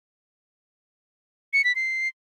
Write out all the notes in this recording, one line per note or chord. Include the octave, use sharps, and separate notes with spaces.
C#7
B6
C7